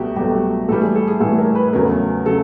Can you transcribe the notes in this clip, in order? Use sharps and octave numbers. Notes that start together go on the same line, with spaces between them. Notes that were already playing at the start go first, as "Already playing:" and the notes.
Already playing: C2 B2 F#3 A3 F#4 G4
C2 B2 F#3 A3 G4
A2 E3 G3 A4
G#4
A4
G#4
A2 E3 G3 A4
A#4
B4
E2 C#3 F#3 A3 A#4
C#3 F#3 A4